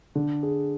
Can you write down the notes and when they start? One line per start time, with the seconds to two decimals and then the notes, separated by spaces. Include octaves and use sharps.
0.15 D3
0.43 G#4